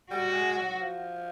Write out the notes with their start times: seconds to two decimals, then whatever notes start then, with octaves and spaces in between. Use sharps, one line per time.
0.11 G3 F#4
0.34 G#3
0.57 F#3
0.81 F3